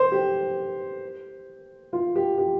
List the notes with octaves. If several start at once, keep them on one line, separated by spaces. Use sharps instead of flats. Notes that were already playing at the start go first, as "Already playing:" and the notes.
Already playing: C5
G4
F4
G4
G4